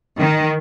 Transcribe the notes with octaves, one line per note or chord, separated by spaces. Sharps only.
D#3